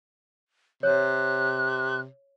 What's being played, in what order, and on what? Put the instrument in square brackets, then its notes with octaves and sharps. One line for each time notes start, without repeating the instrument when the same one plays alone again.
[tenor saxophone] C3 [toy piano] C#5 [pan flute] F#6